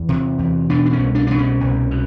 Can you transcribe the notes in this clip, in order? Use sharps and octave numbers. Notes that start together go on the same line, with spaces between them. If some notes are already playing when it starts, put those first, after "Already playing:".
Already playing: E2
C3
E2
B2 D4
D4
C#4
C2
D4
B2 D4
C#4
C2
B2